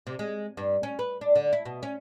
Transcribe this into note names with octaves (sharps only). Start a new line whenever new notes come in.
C3
G#3
G2
C#4
B4
D4
D3
E4
B2
C#4